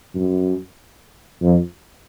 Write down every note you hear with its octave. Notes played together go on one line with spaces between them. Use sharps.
F#2
F2